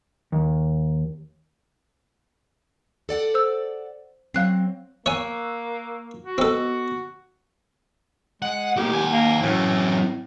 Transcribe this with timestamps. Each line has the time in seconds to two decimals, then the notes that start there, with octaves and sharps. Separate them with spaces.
0.32 D#2
3.09 A4 D5 F#5
3.34 C5 E6
4.34 F#3 C4 F5 F#6 C7
5.06 A#3 C#5 G#5 C#6 E6 F#6
6.24 F#4
6.38 B3 C4 A4 D#5
8.42 G#3 F#5
8.76 A2 A#3 G4
8.92 D#2 G#5
9.12 A#3
9.42 F#2 A2 E3